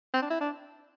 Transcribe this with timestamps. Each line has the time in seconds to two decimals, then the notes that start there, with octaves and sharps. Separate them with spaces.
0.14 C4
0.22 D4
0.30 E4
0.40 D4